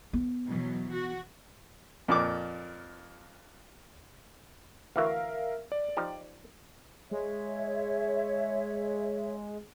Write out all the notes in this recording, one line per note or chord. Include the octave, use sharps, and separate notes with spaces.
B3
B2 E3 F#3
F#4
F2 A#2 D6
D2 E3 F#4 A#4 E5 F5
D5
F3 D#4 G4
G#3 C#5 E5